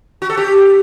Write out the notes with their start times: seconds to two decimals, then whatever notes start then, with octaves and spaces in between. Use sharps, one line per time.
0.22 F#4
0.30 A4
0.37 G4